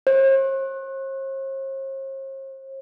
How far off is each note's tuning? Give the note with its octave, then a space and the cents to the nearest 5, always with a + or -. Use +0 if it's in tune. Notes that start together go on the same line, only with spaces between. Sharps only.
C5 +45